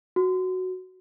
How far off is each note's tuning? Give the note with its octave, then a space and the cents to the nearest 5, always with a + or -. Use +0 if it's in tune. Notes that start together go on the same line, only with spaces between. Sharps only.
F#4 +0